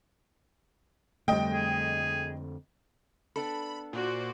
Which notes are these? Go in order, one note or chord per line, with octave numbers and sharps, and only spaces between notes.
F2 D3 G3 A3 D#5 G5
G#4
B3 D4 A4 B5
A#2 F#4 C5 D5